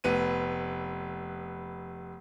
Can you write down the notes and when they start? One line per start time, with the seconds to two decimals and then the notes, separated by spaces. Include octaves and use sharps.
0.04 F1 B3 D#7